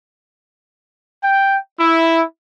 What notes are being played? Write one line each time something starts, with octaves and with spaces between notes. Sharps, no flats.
G5
E4